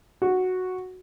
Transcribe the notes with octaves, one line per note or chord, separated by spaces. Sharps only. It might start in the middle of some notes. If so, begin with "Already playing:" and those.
F#4